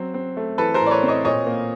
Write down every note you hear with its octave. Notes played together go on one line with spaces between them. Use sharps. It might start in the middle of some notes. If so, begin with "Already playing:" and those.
Already playing: F#3 C4
C4
A3
E3 A4 B4
A#4 C5
A2
D5
B4 C#5
C4
C#5 D#5
A#2 C#5 D#5
A#3